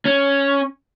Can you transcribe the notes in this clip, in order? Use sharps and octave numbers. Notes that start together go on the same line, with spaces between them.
C#4